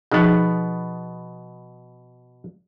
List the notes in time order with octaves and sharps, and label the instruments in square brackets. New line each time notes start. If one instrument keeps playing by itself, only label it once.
[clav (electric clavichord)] B2 B3 [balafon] F3 D#4 G#4